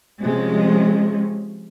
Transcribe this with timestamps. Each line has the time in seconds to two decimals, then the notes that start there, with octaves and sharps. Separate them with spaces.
0.21 C3 F3 G#3 C#4